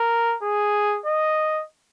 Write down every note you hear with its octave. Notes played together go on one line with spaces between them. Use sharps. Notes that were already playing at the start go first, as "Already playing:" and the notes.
Already playing: A#4
G#4
D#5